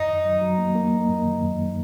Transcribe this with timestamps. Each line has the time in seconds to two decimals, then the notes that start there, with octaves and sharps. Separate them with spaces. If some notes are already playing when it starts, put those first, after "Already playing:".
Already playing: F#2 D#4
0.08 D#3
0.25 F#3
0.41 F#3
0.58 A#3
0.75 A#3
0.93 A#3
1.09 F#2
1.25 D#3
1.43 F#2